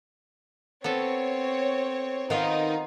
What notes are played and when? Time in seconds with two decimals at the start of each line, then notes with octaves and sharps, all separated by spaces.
0.84 B3 C4 A4 C#5
2.30 D#3 B3 D#4 F4